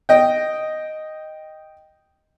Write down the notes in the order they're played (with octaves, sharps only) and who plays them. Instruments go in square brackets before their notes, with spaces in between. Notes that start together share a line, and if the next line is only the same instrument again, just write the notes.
[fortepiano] D#5 G5